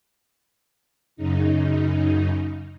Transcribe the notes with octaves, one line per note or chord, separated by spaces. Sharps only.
F#2 C#3 D#4